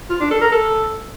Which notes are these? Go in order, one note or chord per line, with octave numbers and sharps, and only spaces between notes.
F4
D4
A4
A#4
A4